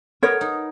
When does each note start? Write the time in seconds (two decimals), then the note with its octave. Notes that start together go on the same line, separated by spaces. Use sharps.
0.23 B3 A#4 C#5
0.41 D#4